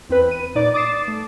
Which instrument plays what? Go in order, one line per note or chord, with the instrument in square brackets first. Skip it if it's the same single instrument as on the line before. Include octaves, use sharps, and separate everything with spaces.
[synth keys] E2 C4 B4
D#7
A#2 D#4 D5 D6
D6 D#6 A6 C7 E7
A3